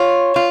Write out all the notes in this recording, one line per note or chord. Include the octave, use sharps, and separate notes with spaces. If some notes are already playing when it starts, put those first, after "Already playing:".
Already playing: F4 C#5
F4